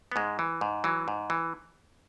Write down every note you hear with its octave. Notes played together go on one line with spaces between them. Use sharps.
B3
G#2 G#3
E3
G#2
E3 F#3
G#2
E3